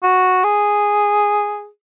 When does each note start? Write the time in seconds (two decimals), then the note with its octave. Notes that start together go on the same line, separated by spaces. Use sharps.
0.03 F#4
0.44 G#4